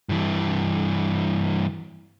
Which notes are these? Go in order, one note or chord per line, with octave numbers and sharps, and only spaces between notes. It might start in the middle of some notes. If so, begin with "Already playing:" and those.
G2 E3